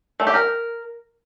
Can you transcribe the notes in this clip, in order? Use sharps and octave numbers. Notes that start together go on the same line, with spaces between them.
A3
G4
A#4